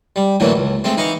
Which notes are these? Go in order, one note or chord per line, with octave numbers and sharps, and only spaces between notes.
G3
A2 D3 E3 F#3 A#3
C#2
G#3 A3 C4
E3 D#4 F5 A#5 C#6